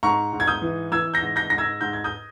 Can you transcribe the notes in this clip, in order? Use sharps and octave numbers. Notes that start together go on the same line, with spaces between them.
G#2 A#5 C#6
G#2
G#6
D#6 G6
E3
E3 E6 G#6
G6 A#6
G#2
G6 A#6
G#2 A#6
E6 G#6
G#2 G6
G#6
D#6 G6